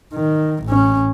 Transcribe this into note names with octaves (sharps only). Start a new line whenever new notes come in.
D#3
A1 C#4